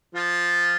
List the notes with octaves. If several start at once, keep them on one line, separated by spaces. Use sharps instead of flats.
F3 F4